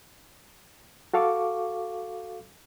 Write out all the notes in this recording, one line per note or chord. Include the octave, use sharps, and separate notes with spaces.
F#4 A4 F5 C#6 D6